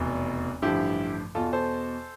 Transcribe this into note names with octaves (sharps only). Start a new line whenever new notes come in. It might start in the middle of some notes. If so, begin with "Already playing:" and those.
Already playing: F1 E2 B2
A1 G2 D3 F3 E4 G4
E2 B2 F4 A4
A4 C5